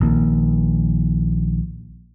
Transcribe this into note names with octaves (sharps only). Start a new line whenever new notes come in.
A#1 D#3 A#3